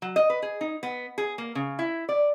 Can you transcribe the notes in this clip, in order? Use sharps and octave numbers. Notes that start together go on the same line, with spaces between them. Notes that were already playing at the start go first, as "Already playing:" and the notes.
F#3
D#5
B4
G#4
D#4
B3
G#4
A#3
C#3
E4
D5